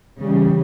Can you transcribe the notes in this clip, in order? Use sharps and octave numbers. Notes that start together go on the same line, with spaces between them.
C#3 E3 G3